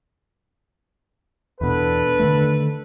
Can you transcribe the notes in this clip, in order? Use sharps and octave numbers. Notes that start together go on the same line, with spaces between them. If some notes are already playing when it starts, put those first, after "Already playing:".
E2 B2 D4 A4 B4
D3 D#3 A3